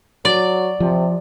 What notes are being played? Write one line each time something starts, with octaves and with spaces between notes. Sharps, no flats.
F#3 D5
C3 F3